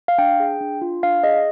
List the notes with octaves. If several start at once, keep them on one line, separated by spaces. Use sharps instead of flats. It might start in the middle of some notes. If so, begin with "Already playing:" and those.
F5
D4 G5
G#4
D4
F4
D4 F5
G#4 D#5